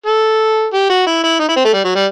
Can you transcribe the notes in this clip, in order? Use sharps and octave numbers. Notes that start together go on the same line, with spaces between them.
A4
G4
F#4
E4
E4
D#4
E4
C4
A3
G3
F#3
G3